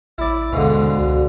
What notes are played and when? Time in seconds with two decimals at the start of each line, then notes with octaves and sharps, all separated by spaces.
0.18 A1 E4 D5
0.53 D#2 G#2 B2 D3 G#3 F5 C6
0.97 C#2 F#4 D5